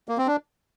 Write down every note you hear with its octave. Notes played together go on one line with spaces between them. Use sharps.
A#3
C4
D4